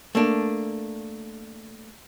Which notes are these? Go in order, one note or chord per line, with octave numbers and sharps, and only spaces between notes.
A3 A#3 D4